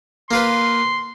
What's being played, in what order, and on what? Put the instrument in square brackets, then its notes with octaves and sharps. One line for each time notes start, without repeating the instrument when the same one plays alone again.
[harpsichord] A#3 F4 B4 [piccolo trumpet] C6